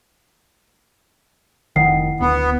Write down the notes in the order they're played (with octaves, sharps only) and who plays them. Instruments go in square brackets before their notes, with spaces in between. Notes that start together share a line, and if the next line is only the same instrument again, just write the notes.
[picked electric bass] F1 D#3 [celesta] E4 F#5 C7
[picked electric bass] D1 [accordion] B3